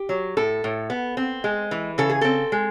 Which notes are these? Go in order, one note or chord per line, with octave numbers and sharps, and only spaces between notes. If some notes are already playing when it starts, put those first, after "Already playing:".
Already playing: G4
F#3
A2 A4
A2
B3
C4
G#3
E3
C#3 A4
G#4
C4 A4
G#3